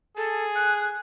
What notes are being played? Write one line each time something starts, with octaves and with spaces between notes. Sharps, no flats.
G#4 A4
F#6